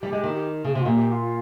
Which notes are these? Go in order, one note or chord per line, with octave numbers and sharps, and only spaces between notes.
G3 G4
G#3
D#3
G4
C#3 G#4
C3 G4
F4
A#2 G4
G4
F4